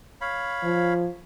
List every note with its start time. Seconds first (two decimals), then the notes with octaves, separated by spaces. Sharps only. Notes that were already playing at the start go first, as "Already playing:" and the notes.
0.21 C#5 F5 B5
0.64 F3